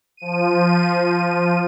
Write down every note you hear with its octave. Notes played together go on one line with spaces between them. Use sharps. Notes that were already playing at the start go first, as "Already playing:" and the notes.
F3 D#7